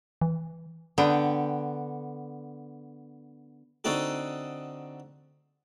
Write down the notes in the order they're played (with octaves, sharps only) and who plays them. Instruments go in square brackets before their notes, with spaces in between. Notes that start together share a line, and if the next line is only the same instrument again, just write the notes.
[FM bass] E3
[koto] D3 B3 G5
[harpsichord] D3 C4 D#4 F#4 A4